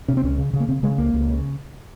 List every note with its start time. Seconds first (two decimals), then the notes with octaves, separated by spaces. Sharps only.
0.08 C3 C#4
0.17 C4
0.23 C#2 C#4
0.38 C#3
0.53 C#3
0.60 A#3
0.69 C#3 C4
0.83 C#3 G#3
0.98 C#2 A#3
1.13 C#2
1.28 C#3